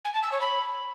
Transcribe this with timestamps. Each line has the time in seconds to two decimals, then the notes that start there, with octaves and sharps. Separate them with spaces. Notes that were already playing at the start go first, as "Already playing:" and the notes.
0.05 G#5
0.14 A5
0.23 E6
0.32 C#5
0.41 B5